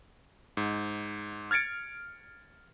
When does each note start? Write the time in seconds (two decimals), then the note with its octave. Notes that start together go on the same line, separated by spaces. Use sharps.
0.57 G#2
1.51 F6 G#6 A6 C#7 D7